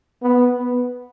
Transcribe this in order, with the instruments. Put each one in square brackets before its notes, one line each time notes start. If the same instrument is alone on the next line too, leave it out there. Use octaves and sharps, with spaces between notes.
[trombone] B3
B3